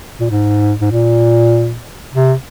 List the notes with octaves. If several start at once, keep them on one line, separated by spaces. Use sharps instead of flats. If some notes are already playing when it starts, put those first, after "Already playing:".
A#2
G#2
G#2
A#2
C3